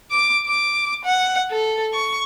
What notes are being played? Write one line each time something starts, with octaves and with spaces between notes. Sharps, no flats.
D6
D6
F#5
A4
C#6